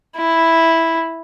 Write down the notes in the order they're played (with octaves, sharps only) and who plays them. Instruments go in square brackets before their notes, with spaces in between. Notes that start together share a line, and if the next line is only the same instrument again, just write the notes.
[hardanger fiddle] E4